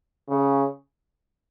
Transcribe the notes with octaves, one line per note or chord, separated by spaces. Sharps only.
C#3